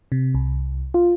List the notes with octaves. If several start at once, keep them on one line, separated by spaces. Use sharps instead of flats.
C3
C2
F4